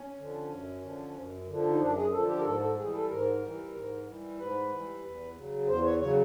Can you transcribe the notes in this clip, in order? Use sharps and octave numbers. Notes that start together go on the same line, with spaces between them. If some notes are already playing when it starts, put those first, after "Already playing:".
Already playing: C#4
D3 F3
F#2
D3 F3
F#2
D3 F3
D#4
F#2 D4
G#4
D3 F3 A4
G4
A#4
G#2 A4
A4
E3 G3 G#4
A4
G#2 A#4
E3 G3
G#2
E3 G3
G#2 B4
E3 G3
E2
C#3 F#3
E2 C5
C#5
C#3 F#3 C#5